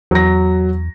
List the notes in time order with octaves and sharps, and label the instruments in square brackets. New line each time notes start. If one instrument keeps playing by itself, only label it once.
[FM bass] E2 [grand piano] F#3 A#6